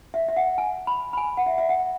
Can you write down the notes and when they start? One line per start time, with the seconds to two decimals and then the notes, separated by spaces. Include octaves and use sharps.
0.14 E5
0.29 E5
0.37 F#5
0.58 G#5
0.87 B5
1.13 B5
1.17 G#5
1.37 F#5
1.46 E5
1.58 E5
1.69 F#5